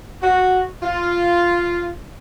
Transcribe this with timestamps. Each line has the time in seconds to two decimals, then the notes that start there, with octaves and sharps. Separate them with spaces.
0.22 F#4
0.83 F4